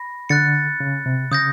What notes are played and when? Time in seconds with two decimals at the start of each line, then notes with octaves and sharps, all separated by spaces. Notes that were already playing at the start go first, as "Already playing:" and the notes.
Already playing: B5 A#6
0.29 D3 F#6 A6 C#7
0.80 C#3
1.06 C3
1.31 C#3 D#6 G6 A#6